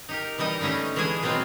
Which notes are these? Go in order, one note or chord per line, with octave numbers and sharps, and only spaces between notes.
D#4 G4 A#4
E3 G3 D#4 D#5
D3 A3 C#4 D#4 G4
E3 G#3 D4 G#4 G#5
B2 F#3 G#3 C4 F4